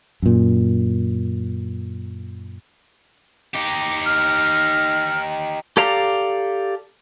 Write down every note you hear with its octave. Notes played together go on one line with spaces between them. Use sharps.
F#2 A#2
D#4 G4
F6
G4 A4 D5 F5 A#5